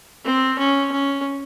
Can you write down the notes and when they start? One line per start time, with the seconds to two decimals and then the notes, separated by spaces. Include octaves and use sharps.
0.25 C4
0.59 C#4
0.92 C#4